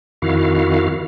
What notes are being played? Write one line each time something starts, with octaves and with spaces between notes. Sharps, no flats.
F2 D#3 E4 F#4 F5